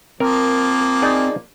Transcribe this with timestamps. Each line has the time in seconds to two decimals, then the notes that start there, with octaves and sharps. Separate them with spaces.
0.20 F3 A#3 C4 A#4
1.02 D#4 G#4 D5